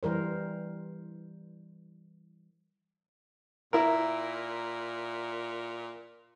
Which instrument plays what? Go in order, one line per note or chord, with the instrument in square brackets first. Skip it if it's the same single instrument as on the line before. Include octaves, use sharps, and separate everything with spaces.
[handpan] E3 G3 A#4 C5
[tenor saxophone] A#2 [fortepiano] E4 A#4